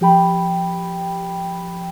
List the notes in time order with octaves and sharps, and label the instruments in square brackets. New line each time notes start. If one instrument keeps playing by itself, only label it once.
[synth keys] F3 G4 G5 B5